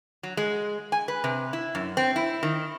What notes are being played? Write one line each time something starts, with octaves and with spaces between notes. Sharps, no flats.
F#3
G#3
G#5
B4
C3
E4
F#2
C4
E4
D#3